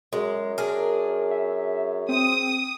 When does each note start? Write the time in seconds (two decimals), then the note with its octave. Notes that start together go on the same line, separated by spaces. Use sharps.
0.13 F#2 G#3
0.58 D4 G#4 A#4
1.31 E5
2.09 C4 D#6